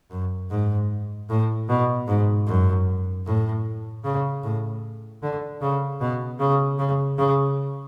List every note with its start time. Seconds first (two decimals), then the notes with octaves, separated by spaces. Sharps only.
0.11 F#2
0.50 G#2
1.29 A2
1.69 B2
2.08 G#2
2.47 F#2
3.26 A2
4.04 C#3
4.43 A2
5.22 D3
5.61 C#3
6.00 B2
6.40 C#3
6.78 C#3
7.18 C#3